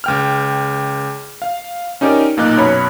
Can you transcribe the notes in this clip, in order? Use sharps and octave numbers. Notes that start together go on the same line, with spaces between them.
C#2 G5 F6
F5
C#4 D#4 G4 A#4 D5
B1 A#2 A#3 D#4 F#6
F#2 B2 C#5 B5